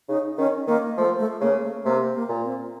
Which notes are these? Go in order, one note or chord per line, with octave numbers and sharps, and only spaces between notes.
C#3 D#4
D#3 C#4
D#3 A#3
F3 A3
A3
C#3 A#3
A3
C3 A#3
A#3
A#2
C4